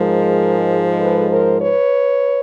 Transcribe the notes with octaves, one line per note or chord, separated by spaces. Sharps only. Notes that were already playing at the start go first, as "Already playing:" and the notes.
Already playing: G#2 F3 G#3 G#4 A#4
A4 B4
A#4 C5
B4 C#5